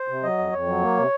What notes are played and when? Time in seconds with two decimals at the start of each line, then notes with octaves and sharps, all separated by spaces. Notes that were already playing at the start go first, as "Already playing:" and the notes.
Already playing: C5
0.08 C3
0.23 F#3 D#5
0.38 F2
0.52 F2 C#5
0.67 F#3
0.82 A#3
0.97 C3